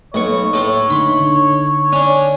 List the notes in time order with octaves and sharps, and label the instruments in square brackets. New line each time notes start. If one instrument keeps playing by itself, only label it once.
[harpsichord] B1 C#6 [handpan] A3 A#3 B4 [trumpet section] C#5
[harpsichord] A2 A4 C6
[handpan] D3 D#4 [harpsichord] B5 C6
[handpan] D3
[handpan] D3 [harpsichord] C#4 D4